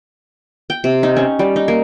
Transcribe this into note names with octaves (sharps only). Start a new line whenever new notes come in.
G5
C3
D#4
C#4
G3
D#4
A#3